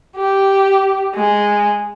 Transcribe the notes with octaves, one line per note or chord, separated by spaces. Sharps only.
G4
G#3